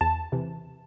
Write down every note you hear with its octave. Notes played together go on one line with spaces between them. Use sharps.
E2 A5
C3 E3